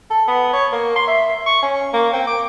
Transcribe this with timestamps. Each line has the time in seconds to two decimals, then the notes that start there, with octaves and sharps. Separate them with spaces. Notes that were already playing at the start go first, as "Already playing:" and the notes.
0.10 A4
0.28 B3
0.53 C#5
0.72 A#3
0.96 C6
1.08 E5
1.46 C#6
1.62 C#4
1.93 A#3
2.13 C4
2.27 D6